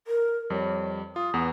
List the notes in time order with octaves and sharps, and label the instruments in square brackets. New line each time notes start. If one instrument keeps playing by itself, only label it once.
[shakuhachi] A#4
[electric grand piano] F2 G3 [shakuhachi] C#5
[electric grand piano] F4 [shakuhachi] D#6
[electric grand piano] E2 B3